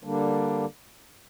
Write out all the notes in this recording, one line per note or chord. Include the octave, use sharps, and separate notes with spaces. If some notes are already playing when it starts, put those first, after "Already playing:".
D3 G3 A#3 D4